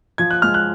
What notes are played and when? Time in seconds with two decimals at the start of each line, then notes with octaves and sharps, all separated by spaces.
0.18 F3 G#6
0.31 F#6
0.42 G#3 F6
0.54 F#6